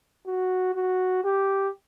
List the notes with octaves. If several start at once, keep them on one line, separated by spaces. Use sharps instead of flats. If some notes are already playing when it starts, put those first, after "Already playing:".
F#4
F#4
G4